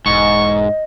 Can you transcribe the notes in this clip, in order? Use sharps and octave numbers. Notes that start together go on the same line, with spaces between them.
E1 G#2 D#5 C#6